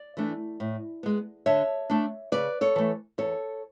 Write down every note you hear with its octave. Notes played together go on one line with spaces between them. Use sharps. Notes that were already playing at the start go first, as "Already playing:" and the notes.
Already playing: D5
E3 A3 D4
A2
G#3 B3
D3 C#5 E5
A3 D4
C#3 B4 D5
A4 C#5
E3 A3
E2 A4 C#5